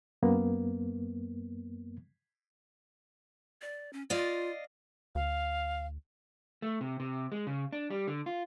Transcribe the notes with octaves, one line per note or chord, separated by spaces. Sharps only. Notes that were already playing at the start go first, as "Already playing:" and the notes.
F#2 A#3 B3
D5
C#4
F4 D5 D#5 F5
D2 F5
A3
C3
C3
G#3
C#3
D4
G3
D3
F4